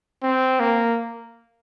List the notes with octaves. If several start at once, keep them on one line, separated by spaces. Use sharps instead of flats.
C4
A#3